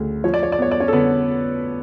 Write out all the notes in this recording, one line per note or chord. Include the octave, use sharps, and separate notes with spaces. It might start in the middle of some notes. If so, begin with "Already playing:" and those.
Already playing: D2 C#3
F3 C#5
D5
C#5
D5
B3 C#5
D5
C#4 C#5
A4
D3 B3 B4